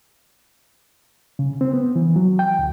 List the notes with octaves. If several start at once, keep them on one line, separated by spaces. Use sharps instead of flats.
C#3
C4
B3
E3
F#3
G5
D2